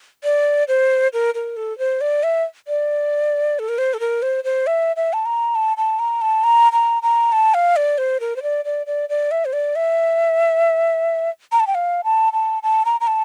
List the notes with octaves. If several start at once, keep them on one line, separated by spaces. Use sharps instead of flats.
D5
C5
A#4
A#4
A4
C5
D5
E5
D5
A4
A#4
C5
A4
A#4
C5
C5
E5
E5
A5
A#5
A5
A5
A#5
A5
A#5
A#5
A#5
A5
F5
D5
C5
A#4
C5
D5
D5
D5
D5
E5
C5
D5
E5
A#5
A5
G5
F5
A5
A5
A5
A#5
A#5
A5